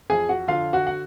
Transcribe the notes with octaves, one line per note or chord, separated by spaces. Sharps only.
F2 G#4 G#5
F#4 F#5
D3 F4 F5
F#4 F#5
F#5